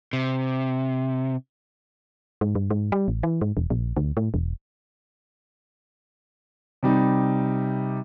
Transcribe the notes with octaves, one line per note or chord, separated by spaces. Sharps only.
C3
G#2
G2
G#2
G3
A1
E3
G#2
E1
A#1
D2
A2
E1
C3 G3 D#4